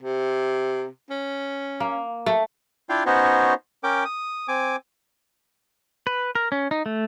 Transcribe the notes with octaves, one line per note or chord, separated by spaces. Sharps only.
C3
C#4
A#3
A3
D4 E4 F4 F5 G5
B3 C#4 D#4 F#4 C5 C#5
C#4 A#4 G5 D6
D#6
C4 G#5 D6
B4
A#4
C#4
D#4
A3